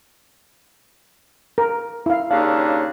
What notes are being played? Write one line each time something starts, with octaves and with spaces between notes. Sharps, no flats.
A#4
E4 F5
D#2 C#3 D4 F5